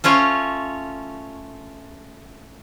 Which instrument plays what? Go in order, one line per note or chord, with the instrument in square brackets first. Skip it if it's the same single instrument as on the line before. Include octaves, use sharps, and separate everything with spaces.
[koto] A3 C#4 F4 C#5